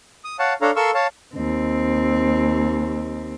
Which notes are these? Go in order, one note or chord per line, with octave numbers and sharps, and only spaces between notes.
D#6
C#5 F5 F#5 A5
D4 A4 C#5 F5 A#5
A4 A#4 F5 C6 C#6 E6
C#5 F5 A5
D#2 C4